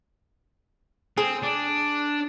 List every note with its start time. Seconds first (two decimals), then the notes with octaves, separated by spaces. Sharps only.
1.17 C4 G#4
1.43 D4